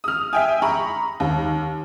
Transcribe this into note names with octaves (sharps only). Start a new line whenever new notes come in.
D#6 F6
E5 G5 G#5
A#5 B5 C#6
D#2